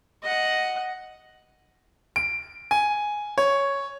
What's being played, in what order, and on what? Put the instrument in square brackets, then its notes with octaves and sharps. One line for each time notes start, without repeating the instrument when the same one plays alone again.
[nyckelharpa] D#5 F#5
[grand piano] D7
G#5
C#5